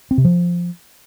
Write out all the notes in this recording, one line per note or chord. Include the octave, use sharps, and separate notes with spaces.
C4
C3
F3